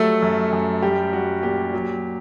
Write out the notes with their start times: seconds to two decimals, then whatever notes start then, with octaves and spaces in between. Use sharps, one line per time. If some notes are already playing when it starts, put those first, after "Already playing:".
Already playing: F#3 G3 A3 A4
0.22 F#2
0.52 F#2
0.82 G3 G4
1.13 G3 F#4
1.43 A#2 G4
1.73 F#3